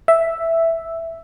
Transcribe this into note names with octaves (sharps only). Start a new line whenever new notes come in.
E5